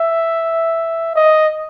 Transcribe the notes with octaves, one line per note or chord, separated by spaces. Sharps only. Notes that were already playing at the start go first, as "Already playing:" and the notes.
Already playing: E5
D#5